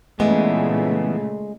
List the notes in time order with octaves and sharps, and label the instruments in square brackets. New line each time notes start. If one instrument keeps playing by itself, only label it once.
[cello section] A#2 C#3 A3 [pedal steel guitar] E3 B3 [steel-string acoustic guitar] G#3